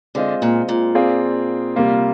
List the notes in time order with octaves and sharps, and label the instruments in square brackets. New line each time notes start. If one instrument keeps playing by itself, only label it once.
[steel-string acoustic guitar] D3 [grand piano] G#3 C4 F4 C5 D#5
[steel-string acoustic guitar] A#2
A#2
[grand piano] C4 F4 G#4 D5 F5
C3 G3 A#3 F4